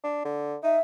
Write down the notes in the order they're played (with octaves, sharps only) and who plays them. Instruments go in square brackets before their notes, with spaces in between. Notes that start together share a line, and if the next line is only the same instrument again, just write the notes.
[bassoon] D4
D3
[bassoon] D#4 [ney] E5